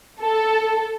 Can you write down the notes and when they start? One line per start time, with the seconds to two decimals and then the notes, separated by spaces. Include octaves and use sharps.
0.21 A4